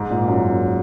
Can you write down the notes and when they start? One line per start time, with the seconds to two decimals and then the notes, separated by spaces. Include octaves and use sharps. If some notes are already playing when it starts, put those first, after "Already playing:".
Already playing: G#2
0.10 A#2
0.28 F#2